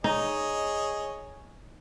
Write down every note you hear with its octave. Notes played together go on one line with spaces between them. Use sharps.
D#4 G#4 C#5 D#5